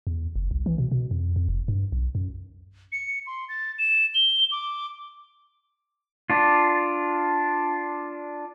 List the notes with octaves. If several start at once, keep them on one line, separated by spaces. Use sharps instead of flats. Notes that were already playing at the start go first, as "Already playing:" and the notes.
E2
F#1
C2
E3
B2
B2
F2
F2
F1
G2
B1
F#2
C#7
C6
A6
E7
G7
D6
D4 F4